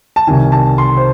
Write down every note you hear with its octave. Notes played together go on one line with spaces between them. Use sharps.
A5
C2 C3 D#3 G#5
A5
C6
C5